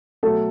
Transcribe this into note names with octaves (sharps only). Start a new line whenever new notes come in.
B2 F#3 A3 A4